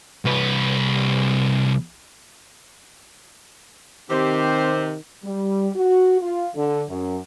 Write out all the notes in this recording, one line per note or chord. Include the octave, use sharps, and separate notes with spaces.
C2 B4
C3 D#3 C4 G4 C5
G3
F#4
F4
D3
F#2